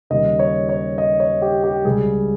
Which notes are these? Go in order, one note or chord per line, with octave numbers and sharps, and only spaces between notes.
D#2 C#3 G3 D#5
C#5
C#5
D#5
C#5
G4
G4
C#2 C#3 G3 G#4